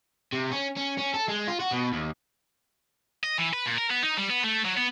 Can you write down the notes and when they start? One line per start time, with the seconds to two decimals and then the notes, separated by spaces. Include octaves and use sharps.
0.33 C3
0.51 C#4
0.77 C#4
0.98 C#4
1.14 A4
1.28 G#3
1.48 F4
1.60 F#4
1.72 B2
1.93 D#2
3.24 D#5
3.38 E3
3.53 B4
3.66 A#2
3.78 A#4
3.91 B3
4.03 D#4
4.19 G3
4.30 B3
4.44 A3
4.65 F#3
4.77 B3